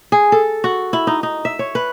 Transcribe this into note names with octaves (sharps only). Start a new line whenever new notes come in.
G#4
A4
F#4
E4
D#4
D#4
E5
C#5
B4